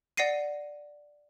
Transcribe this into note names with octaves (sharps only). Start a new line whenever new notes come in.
D5 F#5 A#6 C7 D#7